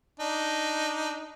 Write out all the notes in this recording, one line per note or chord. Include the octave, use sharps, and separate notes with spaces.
D4 D#4